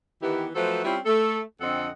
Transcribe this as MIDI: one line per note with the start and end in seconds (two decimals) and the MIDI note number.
0.23 0.47 51
0.23 0.47 52
0.23 0.47 59
0.23 0.47 64
0.23 0.47 67
0.55 0.82 53
0.55 0.82 54
0.55 0.82 57
0.55 0.82 69
0.55 0.82 71
0.55 0.82 72
0.84 0.98 55
0.84 0.98 60
0.84 0.98 61
0.84 0.98 64
0.84 0.98 65
1.05 1.40 57
1.05 1.40 69
1.61 1.89 41
1.61 1.89 50
1.61 1.89 60
1.61 1.89 69
1.61 1.89 75
1.61 1.89 78